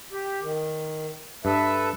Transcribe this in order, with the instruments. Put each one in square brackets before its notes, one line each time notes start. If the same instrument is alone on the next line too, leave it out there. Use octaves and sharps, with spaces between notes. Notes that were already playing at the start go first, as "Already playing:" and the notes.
[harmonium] G4
D#3
[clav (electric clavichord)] G2 [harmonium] A4 B4 E5